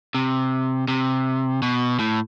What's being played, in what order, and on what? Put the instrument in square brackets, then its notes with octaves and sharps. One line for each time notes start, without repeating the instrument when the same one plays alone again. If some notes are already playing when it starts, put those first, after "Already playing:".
[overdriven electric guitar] C3
C3
B2
A2